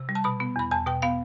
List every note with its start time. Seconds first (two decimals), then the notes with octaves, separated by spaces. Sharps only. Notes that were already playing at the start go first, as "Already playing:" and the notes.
Already playing: C3
0.09 G3
0.15 A5
0.24 B2 B5
0.40 B3
0.56 E2 B5
0.71 E2 A5
0.87 B2 G5
1.02 B3 F5